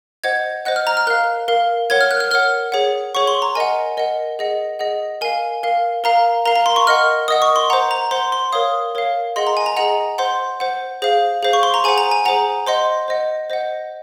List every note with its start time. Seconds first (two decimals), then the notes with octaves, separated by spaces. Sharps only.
0.24 C5 D#5 F#5 G#6
0.65 C5 D#5 F#5 F#6
0.76 F6
0.87 A#5
0.97 F6
1.07 A#4 F5 F#6
1.48 A#4 F5
1.90 A#4 C#5 F#5 G#6
2.01 F6
2.11 F#6
2.20 F6
2.31 A#4 C#5 F#5 F6
2.72 G#4 C#5 F#5
3.15 G#4 C#5 F#5 C#6
3.27 C6
3.42 A#5
3.55 A#4 D#5 F#5 G#5
3.97 A#4 D#5 F#5
4.39 G#4 D#5 F#5
4.79 G#4 D#5 F#5
5.21 A#4 F5 G#5
5.63 A#4 F5
6.04 A#4 F5 A#5
6.45 A#4 F5 A#5
6.56 A#5
6.66 C6
6.76 C#6
6.87 A#4 D#5 F#5 F6
7.28 A#4 D#5 F#5 D#6
7.42 C#6
7.56 C6
7.70 C5 F#5 A#5
7.91 A#5
8.11 C5 F#5 C6
8.32 C6
8.52 A#4 C#5 F5 D#6
8.95 A#4 C#5 F5
9.36 G#4 D#5 F#5 C6
9.47 A#5
9.57 G#5
9.66 A#5
9.77 G#4 D#5 F#5 A#5
10.18 C5 F#5 C6
10.60 C5 F#5
11.02 G#4 C5 F5
11.43 G#4 C5 F5
11.53 C#6
11.63 C6
11.74 A#5
11.84 G#4 C5 F#5 G#5
11.98 A#5
12.11 G#5
12.25 G#4 C5 F#5 A#5
12.67 C5 D#5 F#5 C6
13.08 C5 D#5 F#5
13.50 C5 D#5 F#5